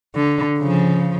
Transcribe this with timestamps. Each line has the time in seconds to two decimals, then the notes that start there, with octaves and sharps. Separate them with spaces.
0.15 D3
0.59 C#3 F3